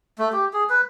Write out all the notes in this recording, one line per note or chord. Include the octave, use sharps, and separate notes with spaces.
A3
G4
G#4
B4